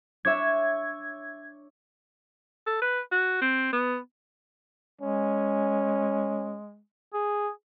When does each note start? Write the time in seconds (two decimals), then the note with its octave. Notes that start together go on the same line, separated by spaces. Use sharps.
0.25 D4 C#5 E5 G#6
2.67 A4
2.82 B4
3.12 F#4
3.42 C4
3.73 B3
5.01 G#3 C#4
7.13 G#4